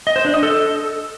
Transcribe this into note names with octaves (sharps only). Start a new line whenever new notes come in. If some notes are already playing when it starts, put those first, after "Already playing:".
D#5
C5
D4
D#5
A4